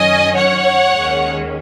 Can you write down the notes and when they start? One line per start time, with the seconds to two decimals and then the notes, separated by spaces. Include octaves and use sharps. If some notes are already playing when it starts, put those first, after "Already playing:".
Already playing: F#2 D#3 F#3 C#4 D#5 G#5
0.36 C#5 F#5
0.90 D#2 D#3 G#3 C#4